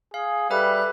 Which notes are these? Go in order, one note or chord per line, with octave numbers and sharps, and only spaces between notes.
G#4 F5
G3 A4 B4 E5 B5 F#6